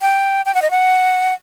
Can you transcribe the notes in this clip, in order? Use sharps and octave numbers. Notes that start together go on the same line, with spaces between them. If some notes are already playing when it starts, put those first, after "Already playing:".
G5
G5
F#5
D#5
F#5